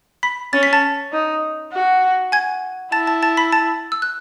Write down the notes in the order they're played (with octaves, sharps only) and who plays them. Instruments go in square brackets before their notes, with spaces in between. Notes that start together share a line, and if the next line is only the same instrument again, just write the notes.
[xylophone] B5 B6
[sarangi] C#4 [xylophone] A6
[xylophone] B6
A5 A6
[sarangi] D#4
F#4
[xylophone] G#5 G#6
[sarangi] E4 [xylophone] A5 A6
[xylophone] A5 A6
A5 A6
B5 B6
A5 A6
E6
F#6